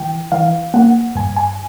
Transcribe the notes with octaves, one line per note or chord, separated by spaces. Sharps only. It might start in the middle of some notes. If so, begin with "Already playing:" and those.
Already playing: E3 G5
E3 F5
A#3 F#5
G2 G#5
G#5